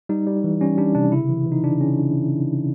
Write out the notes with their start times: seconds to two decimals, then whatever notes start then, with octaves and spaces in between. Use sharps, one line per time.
0.09 G3 D#4
0.27 G3
0.44 E3
0.61 G3 C#4
0.78 G3 D4
0.95 C3 D4
1.12 C#3 E4
1.29 E3
1.46 E3
1.52 D#4
1.64 C#3 D4
1.80 C#3 C#4